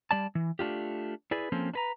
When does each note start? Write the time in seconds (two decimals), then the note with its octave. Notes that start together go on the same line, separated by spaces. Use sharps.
0.11 G3 D5 A5
0.35 E3
0.59 A3 D4 F4 G4
1.31 E4 G#4 B4 D5
1.52 F3 A#3 C4 C#4 A4
1.74 D4 B4 A#5